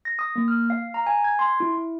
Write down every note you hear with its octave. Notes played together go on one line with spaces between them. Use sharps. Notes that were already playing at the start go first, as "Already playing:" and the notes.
A#6
D#6
A#3
F6
F5
A#5
G#5
G#6
C6
E4
E4